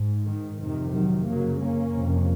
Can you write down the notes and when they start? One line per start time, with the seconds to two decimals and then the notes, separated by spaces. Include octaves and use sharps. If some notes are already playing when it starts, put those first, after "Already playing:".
Already playing: G#2
0.27 D#3
0.60 F2 C3 D#3
0.93 D#3 F#3
1.26 F#2 C#3 F#3 A#3
1.60 A#3 C#4
1.93 F2 C3